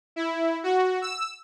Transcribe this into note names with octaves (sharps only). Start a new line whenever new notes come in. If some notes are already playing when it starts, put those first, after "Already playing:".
E4
F#4
E6